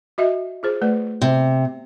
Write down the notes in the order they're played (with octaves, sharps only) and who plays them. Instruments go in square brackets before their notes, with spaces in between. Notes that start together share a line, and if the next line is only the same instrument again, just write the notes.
[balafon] F#4 D#5 E5
F4 G#4 C5
A3 B4 D5
[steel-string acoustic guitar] C3